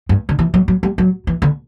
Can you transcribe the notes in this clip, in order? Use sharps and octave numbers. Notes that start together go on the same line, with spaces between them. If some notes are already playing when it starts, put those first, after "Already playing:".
G2
D3
E3
F#3
F#3
G3
F#3
E3
D3